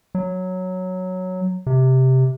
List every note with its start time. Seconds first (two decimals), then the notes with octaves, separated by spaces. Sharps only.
0.15 F#3
1.66 C3